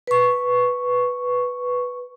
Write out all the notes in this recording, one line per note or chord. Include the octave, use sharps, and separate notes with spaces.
B4 C#6